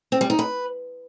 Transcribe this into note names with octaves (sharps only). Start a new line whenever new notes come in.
C4
G3
D#4
B4